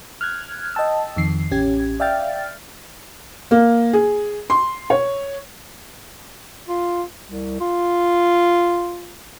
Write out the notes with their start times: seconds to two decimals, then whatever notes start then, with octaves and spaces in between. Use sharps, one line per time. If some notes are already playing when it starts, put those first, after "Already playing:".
0.21 F6 F#6 G#6
0.75 D#5 G5 A5 E6
1.16 F2 D#3 C7
1.51 A1 C#4 G4 G#6
2.00 D5 E5 F5 G5 F6 A6
3.51 A#3
3.93 G#4
4.50 C6
4.90 C#5
6.68 F4
7.25 C2
7.60 F4